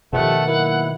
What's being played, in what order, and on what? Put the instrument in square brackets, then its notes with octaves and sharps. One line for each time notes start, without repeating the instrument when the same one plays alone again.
[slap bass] B2 D#3 [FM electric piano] F3 G3 D5 [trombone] A3 [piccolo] F#5
[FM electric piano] F#3 A#3 [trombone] E4